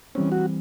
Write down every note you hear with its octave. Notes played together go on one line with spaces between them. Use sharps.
E3 G3 C4 C#4
F#4